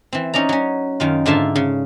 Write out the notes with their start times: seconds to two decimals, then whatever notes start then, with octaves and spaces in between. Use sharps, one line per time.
0.13 E3 C4
0.34 C#4 D#4 D5 A#5
0.49 F#3 C#4
1.00 F#2 D#3 F4
1.26 G#2 D3 F4 E5 A5 C6
1.56 C#3